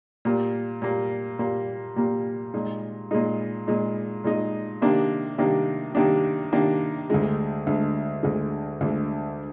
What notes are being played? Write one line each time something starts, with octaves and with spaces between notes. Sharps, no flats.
A#2 G3 A#3
A#2 G3 A#3
A#2 G3 A#3
A#2 G3 A#3
A#2 G#3 D#4
A#2 G#3 D#4
A#2 G#3 D#4
A#2 G#3 D#4
C3 D#3 A#3 D4
C3 D#3 A#3 D4
C3 D#3 A#3 D4
C3 D#3 A#3 D4
D2 D3 G#3
D2 D3 G#3
D2 D3 G#3
D2 D3 G#3